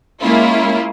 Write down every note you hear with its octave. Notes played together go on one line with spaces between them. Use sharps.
G#3 A#3 C#4 E4 F4